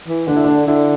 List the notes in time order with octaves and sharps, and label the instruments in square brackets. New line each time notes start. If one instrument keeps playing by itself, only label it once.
[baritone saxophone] E3
[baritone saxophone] D3 [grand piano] D4
[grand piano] E4
D4
[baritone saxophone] D3 [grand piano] E4